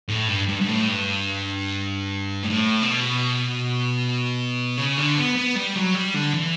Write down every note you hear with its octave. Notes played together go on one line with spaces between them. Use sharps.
A2
G2
G2
G2
A2
G2
A2
B2
C#3
D3
B3
B3
G3
F#3
G3
D3
E3